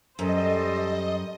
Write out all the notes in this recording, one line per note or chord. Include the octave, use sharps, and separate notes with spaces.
F#2 G3 A4 C5 D#5